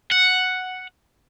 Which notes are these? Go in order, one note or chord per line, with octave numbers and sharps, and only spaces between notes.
F#5